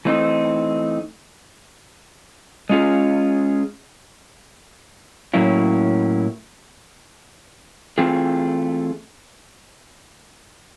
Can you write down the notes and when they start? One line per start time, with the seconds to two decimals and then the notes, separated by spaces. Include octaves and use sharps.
0.05 E3 A3 C4 D#4
2.69 G#3 C#4 F4 G#4
5.34 A2 F#3 A#3 C#4 E4
7.98 E3 A3 C4 F4 G#4